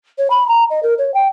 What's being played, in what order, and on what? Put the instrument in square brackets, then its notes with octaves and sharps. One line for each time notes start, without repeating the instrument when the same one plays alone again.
[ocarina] C#5
B5
A#5
D#5
A#4
C#5
G5